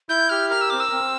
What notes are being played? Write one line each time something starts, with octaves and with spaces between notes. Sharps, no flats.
E4 G6
G4 F6
A#4 F6
E6
C4 D6
E6
C4